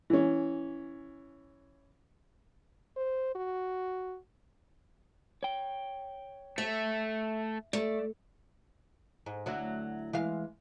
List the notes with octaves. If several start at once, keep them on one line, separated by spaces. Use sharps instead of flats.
E3 C#4
C5
F#4
C#5 G5
A3 E5
A3 D5
G#2
D2 F#3 E4
E3 G#3 F5